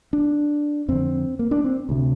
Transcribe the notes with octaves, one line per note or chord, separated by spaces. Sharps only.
D4
F2 D3 C4
A#3
D4
C4
D2 C3